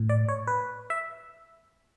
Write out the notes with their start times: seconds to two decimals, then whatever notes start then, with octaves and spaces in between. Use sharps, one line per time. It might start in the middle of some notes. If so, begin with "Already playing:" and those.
Already playing: A2
0.09 D5
0.28 C#5
0.47 B4
0.90 E5